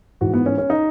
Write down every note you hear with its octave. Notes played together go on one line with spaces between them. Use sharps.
G#2 E3 F#4
B3
C#4
C#4
D#4